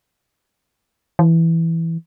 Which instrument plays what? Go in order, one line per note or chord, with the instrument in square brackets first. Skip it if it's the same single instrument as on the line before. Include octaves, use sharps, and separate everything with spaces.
[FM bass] E3